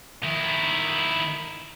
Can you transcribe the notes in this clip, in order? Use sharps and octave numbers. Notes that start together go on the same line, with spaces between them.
D#3 E4